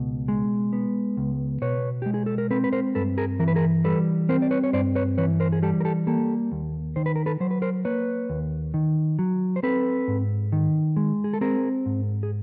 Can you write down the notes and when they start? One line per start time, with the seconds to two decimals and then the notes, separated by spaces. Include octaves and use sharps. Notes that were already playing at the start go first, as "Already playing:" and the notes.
Already playing: C#2 B2
0.28 G#3
0.73 B3
1.17 C#2
1.62 B2 B4 C#5
2.02 G#3 G4
2.14 G#4
2.26 A4
2.38 A#4
2.51 C4 A4 B4
2.64 B4
2.72 A#4 C5
2.95 G2 A4 B4
3.18 G#4 A#4
3.39 E3 A#4
3.48 B4
3.55 G#4 A#4
3.84 G3 A4 B4
4.29 C4 A#4 C5
4.42 D5
4.51 B4 C#5
4.63 C#5
4.73 G2 C5 D5
4.95 B4 C#5
5.18 E3 B4 C#5
5.40 A#4 C5
5.52 G#4
5.62 G3 G4 A4
5.80 A#4
5.85 G4 A4
6.07 A#3 G4 A4
6.52 D#2
6.96 D#3 C5
7.06 B4
7.16 A#4
7.26 A4 B4
7.40 F#3 C5
7.51 B4
7.62 A#4 C5
7.85 A#3 B4 C#5
8.30 D#2
8.74 D#3
9.19 F#3
9.56 C5
9.63 C4 A4 B4
10.08 G#2
10.52 D#3
10.97 G#3
11.24 G#4
11.33 A4
11.41 C4 G#4 A#4
11.86 G#2
12.23 G#4